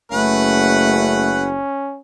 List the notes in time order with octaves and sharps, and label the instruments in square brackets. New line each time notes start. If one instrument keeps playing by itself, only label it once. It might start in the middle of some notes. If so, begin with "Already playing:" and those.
[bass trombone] F#1 [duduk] A3 [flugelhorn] C#4 [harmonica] B4 F#5